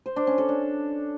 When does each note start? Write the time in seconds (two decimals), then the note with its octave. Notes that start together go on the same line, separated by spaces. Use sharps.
0.06 C5
0.16 D4
0.27 C#4
0.38 A4
0.49 D4